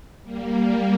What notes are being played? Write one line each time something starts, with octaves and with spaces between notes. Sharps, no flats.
G3 A#3